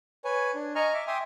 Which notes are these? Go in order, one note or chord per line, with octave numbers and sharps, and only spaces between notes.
B4 C#5 G#5
D4
D#5 G#5 A#5 C#6 F6
E5 D6
E5 G5 G#5 C6 D6 D#6